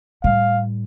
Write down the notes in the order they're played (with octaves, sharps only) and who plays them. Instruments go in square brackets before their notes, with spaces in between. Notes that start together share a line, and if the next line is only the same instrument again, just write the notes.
[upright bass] A2 G3 [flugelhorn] F5